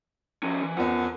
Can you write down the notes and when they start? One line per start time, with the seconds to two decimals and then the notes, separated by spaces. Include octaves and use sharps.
0.43 F3 C#4
0.63 E3
0.77 E2 F3 A#4 F#5